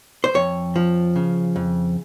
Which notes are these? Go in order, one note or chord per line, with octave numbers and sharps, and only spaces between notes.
C5
F2 C#5
F3
C#3
F2